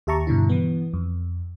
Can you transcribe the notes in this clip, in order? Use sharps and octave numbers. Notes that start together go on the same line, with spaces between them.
D#2 G4 E5 A5 A#5 C#6
G2 B2 D3 E4
E3 B3
F2